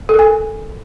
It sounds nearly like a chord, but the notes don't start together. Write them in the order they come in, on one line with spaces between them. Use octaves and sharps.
A4 A#4 G#5